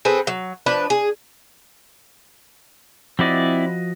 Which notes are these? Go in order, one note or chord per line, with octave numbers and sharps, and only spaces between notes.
C4 G#4 A4 B4
F#3
F3 D4 B4
G#4
F3 C4 E4 F#4 D5 D#5